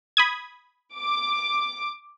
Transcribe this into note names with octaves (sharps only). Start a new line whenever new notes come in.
B5 D#6 G#6
D6